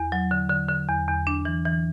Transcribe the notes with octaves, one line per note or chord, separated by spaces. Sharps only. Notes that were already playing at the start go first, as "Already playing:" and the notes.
Already playing: E2
F#3
D3
D3
D3
E2
E2
D4
E3
E3